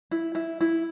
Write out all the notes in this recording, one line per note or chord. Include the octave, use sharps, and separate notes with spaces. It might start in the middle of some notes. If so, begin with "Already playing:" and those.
E4
E4
E4